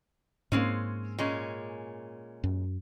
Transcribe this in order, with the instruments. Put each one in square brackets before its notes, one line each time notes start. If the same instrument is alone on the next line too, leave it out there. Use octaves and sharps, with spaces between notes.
[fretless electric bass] G#2 A#3 [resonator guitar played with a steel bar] G#3 C4 C#4
[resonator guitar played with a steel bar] A#2 G#3 C#4
[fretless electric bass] F#2